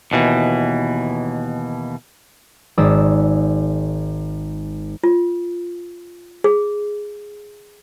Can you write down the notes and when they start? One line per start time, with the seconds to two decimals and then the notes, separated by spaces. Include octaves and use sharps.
0.12 D#2 B2 E3
2.78 G#1 G#3 D5 D#6 E6
5.04 F4
6.44 G#4